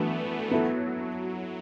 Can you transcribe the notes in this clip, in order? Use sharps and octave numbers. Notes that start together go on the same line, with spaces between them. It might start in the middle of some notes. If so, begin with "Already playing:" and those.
Already playing: E3 F#3 A3 B3 D4 B4
A3
F#3 B3 E4 A4